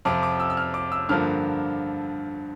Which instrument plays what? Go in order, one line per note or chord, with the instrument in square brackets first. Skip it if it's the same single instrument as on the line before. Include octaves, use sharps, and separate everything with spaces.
[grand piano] F2 C3 F3 D6
D6
E6
E6
F6
D6
E6
G2 D3 F3 A#3 F6